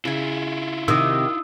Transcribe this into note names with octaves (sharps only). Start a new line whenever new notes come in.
C#3 E4 F4 G#4
C3 D#3 D#4 D#6 E6